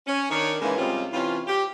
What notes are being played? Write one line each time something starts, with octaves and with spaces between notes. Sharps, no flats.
C#4
D#3 D4 C#5
G#2 C#3 E3 G#3 A#3
C3 G3 G#3 C4 C#4 F4
C3 E3 C#4 F4
G4